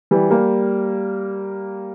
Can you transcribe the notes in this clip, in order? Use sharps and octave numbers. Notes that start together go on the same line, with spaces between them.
E3 G3
G3 A#3